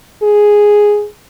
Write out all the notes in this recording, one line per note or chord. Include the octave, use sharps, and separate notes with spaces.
G#4